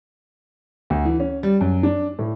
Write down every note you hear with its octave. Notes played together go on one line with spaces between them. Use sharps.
D2
E3
C#4
G3
F#2
D4
A2